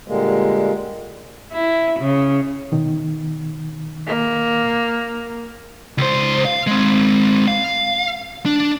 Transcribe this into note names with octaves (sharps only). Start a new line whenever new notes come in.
A#2 D3 G3 G#3 A#3
E4
C#3
B2 D#3
A#3
C#2 C5
F5
G#3 C4
F5
D4